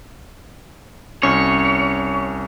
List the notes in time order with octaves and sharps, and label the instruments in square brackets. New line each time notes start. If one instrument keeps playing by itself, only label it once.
[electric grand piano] C2 C#4 [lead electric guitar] C#5